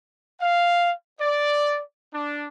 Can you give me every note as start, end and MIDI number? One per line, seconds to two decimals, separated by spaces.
0.40 0.92 77
1.19 1.81 74
2.13 2.46 62